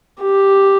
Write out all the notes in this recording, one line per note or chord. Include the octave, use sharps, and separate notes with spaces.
G4